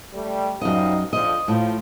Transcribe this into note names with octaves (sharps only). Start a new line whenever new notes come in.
G3 A3
F#2 F3 G3 D#4 D#5
F2 D3 F3 D#5
A2 F3